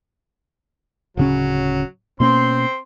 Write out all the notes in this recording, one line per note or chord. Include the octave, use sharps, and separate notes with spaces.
D1 C#3 F#3 C#4
B2 A#3 C4 C#4 C6